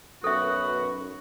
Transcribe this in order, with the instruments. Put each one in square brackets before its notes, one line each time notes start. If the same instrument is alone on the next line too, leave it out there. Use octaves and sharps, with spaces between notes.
[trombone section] B1 F#2 B4 [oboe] F#4 [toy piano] A4 E5